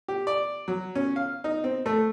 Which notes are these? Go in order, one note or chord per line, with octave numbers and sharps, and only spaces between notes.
G4
D5
F#3
C#4
F5
D#4
C4
A3